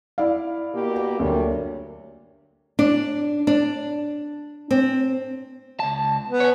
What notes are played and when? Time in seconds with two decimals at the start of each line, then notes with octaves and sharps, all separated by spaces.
0.18 E4 D5 F5
0.73 B2 A#3 G4
1.19 D2 F#3 G3 A#3 C#5
2.79 D4
3.47 D4
4.71 C4
5.80 C#2 A5
6.28 B3
6.40 C#5 G#5